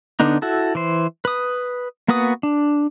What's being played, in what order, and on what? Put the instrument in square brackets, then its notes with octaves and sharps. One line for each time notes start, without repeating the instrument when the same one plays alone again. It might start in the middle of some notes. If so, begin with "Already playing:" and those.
[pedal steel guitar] D3 B3 D4 D#4
E4 F#4 A4
E3 C5
B4 D#6
A#3 B3 F#4 B4 D#6
D4